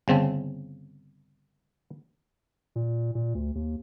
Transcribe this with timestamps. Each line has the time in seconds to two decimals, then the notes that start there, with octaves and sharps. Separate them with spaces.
0.08 G1 C#3 C4 A5
2.76 A#2
3.15 A#2
3.35 D2
3.55 D#2